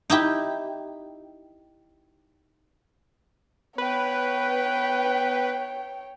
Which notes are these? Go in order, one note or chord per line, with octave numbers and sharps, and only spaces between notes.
D#4 E4 G4
B3 B4 C#5 G5